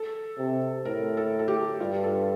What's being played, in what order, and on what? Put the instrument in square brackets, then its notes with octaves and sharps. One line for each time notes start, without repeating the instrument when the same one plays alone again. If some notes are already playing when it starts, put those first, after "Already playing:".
Already playing: [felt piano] A4
[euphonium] C3
[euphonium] A2 [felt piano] A#4
[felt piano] A4
A4
G4
[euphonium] G2 [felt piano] F4
[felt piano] A4